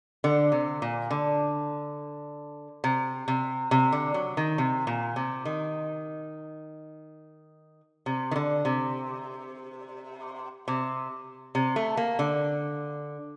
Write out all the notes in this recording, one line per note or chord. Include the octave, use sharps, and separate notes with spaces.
D3
C3
A#2
D3
C3
C3
C3
D3
F#3
D#3
C3
A#2
C3
D#3
C3
D#3
D3
C3
C3
C3
A3
A#3
D3